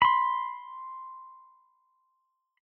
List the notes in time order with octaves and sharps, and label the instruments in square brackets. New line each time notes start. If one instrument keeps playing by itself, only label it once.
[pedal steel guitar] B5 C6